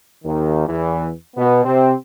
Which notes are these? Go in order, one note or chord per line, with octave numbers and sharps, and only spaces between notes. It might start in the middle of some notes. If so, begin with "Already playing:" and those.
D#2 D#3
E2 E3
B2 B3
C3 C4